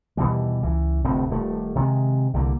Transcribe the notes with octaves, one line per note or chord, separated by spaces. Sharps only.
D#2 B2 E3 G3
C#2 E3
F1 D2 A2 C4
D#1 A3
C3 D#3 F#3 G#3
C2 D3 D#3 A#3